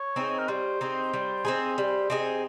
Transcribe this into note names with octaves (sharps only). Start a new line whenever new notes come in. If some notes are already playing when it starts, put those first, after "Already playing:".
Already playing: C#5
C4 D#4 G#4
A#4
G3 C5
C4 D#4 G#4
G3
C4 D#4 G#4
G3
C4 D#4 G#4